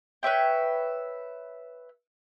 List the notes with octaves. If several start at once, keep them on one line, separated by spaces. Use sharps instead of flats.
B4 C#5 E5 G5